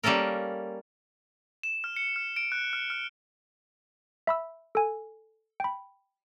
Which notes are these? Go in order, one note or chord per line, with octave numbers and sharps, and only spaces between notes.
G3 A#3 C#4 A4 A#4
E7
F6
C#7
F6
D7
F#6
F6
F6
E5 B5 E6
A4 G#5
G5 B5